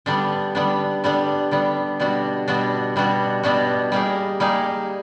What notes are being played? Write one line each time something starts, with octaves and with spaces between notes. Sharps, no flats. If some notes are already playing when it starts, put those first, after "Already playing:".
D3 G3 B3 D4
D3 G3 B3 D4
D3 G3 B3 D4
D3 G3 B3 D4
B2 G3 B3 D4 F#4
B2 G3 B3 D4 F#4
B2 G3 B3 D4 F#4
B2 G3 B3 D4 F#4
G3 A#3 D#4 G#4
G3 A#3 D#4 G#4